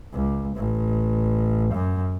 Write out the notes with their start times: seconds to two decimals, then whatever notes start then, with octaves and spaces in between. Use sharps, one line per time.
0.13 C#2
0.57 A1
1.73 F#2